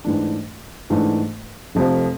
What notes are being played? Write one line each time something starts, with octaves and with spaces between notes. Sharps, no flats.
G#2 E3 A3 D4
G#2 E3 A3 D4
F1 F2 C3 F3